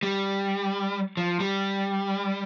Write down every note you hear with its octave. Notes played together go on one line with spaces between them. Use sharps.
G3
F3
G3